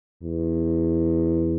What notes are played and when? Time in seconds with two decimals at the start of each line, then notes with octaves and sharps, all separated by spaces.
0.23 E2